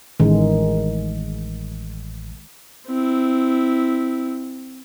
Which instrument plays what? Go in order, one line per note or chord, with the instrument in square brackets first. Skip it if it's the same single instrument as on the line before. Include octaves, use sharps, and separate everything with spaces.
[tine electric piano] A1 [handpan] D#3 G#3
[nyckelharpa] C4 E4